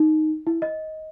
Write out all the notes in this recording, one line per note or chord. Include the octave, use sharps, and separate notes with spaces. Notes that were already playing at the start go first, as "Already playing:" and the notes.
Already playing: D#4
E4
D#5